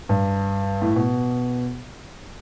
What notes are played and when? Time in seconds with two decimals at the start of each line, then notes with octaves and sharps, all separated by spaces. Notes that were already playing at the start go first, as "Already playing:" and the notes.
0.09 G2
0.82 A2
0.96 B2